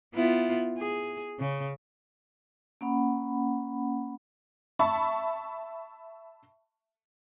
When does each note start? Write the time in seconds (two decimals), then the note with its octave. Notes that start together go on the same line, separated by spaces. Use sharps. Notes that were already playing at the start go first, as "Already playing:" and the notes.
0.15 B3 E4 F4
0.78 G#4
1.39 C#3
2.81 A#3 C#4 F#5 B5
4.79 E5 A5 B5 C#6